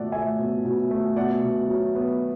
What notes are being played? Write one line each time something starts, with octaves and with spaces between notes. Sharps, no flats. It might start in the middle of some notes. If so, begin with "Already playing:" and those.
Already playing: B2 A3 D5 F#5
A3 E5 G#5
B2
B2
A3
B2 D5 F#5
B2
F#3
B3